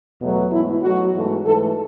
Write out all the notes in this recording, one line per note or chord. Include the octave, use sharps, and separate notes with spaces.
E2 B2 F#3 A3
G#2 E3 A3 E4
B2 F#3 A3 F#4
G#2 E3 A3
G#2 E3 A3 A4